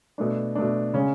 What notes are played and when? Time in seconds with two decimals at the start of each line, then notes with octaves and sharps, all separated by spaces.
0.18 B2 A3 D4
0.55 B2 A3 D4
0.94 C#3 G#3 C#4